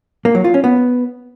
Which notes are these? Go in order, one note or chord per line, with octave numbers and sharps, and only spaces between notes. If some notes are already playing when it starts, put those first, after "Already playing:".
A#3
F#3
F4
C#4
B3